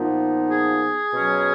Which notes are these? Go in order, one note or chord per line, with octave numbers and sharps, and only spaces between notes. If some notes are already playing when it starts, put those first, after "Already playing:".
Already playing: A#2 F3 B3 D#4
G#4
B2 F#3 C#4